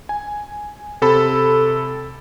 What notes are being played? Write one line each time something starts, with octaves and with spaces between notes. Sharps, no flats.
G#5
C3 A4 B5